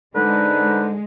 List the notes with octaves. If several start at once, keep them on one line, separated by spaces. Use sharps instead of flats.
G#2 D3 G#3 D#4 B4